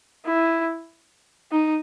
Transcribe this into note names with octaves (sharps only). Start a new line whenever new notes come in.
E4
D#4